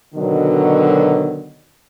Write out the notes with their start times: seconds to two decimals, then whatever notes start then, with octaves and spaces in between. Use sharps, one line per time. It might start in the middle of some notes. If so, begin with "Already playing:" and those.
0.15 B2 D3 D#3 F#3